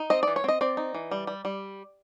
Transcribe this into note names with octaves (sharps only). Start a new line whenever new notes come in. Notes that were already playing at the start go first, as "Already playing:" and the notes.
Already playing: D#4
C4 D#5
E3 D5
C#5
C4 D#5
C4 D5
D#4
E3
G3
G3
G3